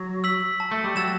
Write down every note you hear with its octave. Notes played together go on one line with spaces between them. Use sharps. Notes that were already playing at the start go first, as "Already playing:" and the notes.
Already playing: F#3
E6 B6 F#7
A5
A3
G3
F#3 E6 A6 E7